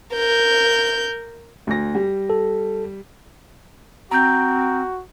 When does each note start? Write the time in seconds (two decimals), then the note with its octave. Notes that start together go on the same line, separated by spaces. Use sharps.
0.15 A#4 G6
1.67 D2 A#6
1.95 G3
2.30 A4
4.11 C4 F#4 A#5 G6